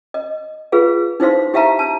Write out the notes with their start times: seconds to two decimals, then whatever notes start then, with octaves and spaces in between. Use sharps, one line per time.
0.14 D#5
0.72 F4 G#4 B4 F5
1.20 D#4 E4 C5 F5 C6
1.54 E4 G4 E5 F5 A5 A#5
1.79 A5